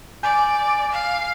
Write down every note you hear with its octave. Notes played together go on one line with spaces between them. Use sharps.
D5 G#5 G6
F5